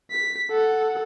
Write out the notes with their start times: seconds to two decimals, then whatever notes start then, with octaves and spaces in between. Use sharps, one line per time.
0.11 B6
0.51 A4 F#5